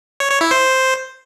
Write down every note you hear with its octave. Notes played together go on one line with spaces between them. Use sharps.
C#5
C#5
E4
C5